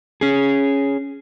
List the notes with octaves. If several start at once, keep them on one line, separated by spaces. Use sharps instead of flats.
C#4 G#4